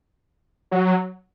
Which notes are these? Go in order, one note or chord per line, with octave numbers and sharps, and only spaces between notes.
F#3